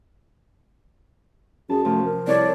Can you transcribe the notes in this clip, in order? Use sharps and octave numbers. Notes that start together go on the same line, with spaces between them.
F#2 G#4 A5
C3 F3 A3
A#4
C2 A4 C#5 D5 G5